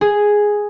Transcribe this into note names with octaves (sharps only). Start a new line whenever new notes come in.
G#4